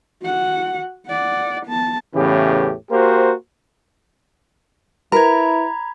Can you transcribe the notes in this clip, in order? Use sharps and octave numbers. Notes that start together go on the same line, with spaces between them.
F#4 F#5
D5 F#5
B3 A5
E2 A2 C#3 E3 C#4 G4
A#3 F#4 G4 A#4 C5
E4 A#4 B4 A#5 B5 G#6